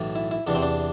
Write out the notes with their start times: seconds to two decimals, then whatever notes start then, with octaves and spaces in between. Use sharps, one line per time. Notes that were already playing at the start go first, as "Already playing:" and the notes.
Already playing: B1 A2 E3
0.16 E4
0.31 E4
0.47 E2 C3 E3 D4
0.55 C4
0.62 D4